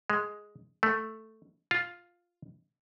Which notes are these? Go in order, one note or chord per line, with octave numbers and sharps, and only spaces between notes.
G#3
A3
F4